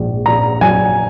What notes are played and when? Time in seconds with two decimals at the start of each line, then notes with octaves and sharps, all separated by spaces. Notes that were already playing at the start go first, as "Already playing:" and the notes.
Already playing: A#1 G#2
0.26 A#1 A#5
0.61 F#3 G#5